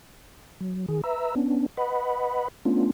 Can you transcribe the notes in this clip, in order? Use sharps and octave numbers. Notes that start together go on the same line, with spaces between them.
F#3
D#3 G#4
B4 E5 A#5 E6
B3 C#4 D4
B4 D#5 F#5 B5
A3 B3 C#4 D4 F4